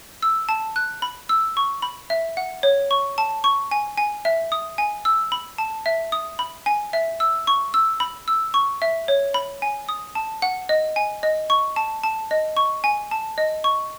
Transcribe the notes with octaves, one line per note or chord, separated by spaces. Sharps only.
E6
A5
F#6
B5
E6
C#6
B5
E5
F#5
C#5
C#6
A5
C#6
G#5
G#5
E5
D#6
G#5
E6
B5
A5
E5
D#6
B5
G#5
E5
E6
C#6
E6
B5
E6
C#6
E5
C#5
B5
G#5
D#6
A5
F#5
D#5
G#5
D#5
C#6
A5
A5
D#5
C#6
G#5
A5
D#5
C#6